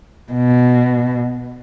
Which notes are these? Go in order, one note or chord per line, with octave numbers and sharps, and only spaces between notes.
B2